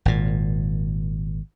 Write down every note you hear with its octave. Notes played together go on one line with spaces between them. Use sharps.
G#1 A#2